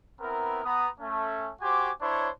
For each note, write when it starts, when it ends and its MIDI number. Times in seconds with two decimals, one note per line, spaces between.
0.21 0.61 59
0.21 0.61 60
0.21 0.61 64
0.21 0.61 70
0.64 0.89 59
0.64 0.89 82
0.64 0.89 87
1.00 1.51 57
1.00 1.51 61
1.62 1.91 66
1.62 1.91 67
1.62 1.91 72
1.62 1.91 80
1.62 1.91 84
1.62 1.91 86
2.02 2.30 62
2.02 2.30 64
2.02 2.30 72
2.02 2.30 73